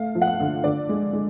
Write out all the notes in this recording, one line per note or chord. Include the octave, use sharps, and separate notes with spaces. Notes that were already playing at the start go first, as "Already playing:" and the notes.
Already playing: A3 F5
F3
F#5
F5
D3
D3 D5
G#3
G#3